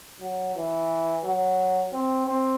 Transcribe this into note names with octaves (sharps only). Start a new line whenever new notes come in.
F#3
E3
F#3
C4
C4